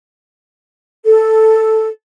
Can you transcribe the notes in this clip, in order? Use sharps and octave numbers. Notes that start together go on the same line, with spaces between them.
A4